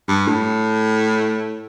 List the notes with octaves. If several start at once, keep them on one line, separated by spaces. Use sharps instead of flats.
G2
A2